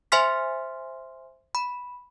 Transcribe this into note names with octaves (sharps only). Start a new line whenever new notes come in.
C5 E5 G#5 C6 F6 B6
B5